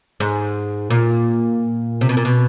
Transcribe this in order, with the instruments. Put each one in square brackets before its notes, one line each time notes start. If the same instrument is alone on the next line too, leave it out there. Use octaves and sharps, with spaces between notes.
[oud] G#2
A#2
C3
B2
A#2
B2